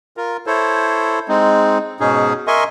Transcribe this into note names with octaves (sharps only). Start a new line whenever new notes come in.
F4 A#4
E4 A4 C5 C#5
G#3 C4 D#4
G#2 B2 C#4 D#4 G#4
A#4 D#5 E5 G#5 C6 C#6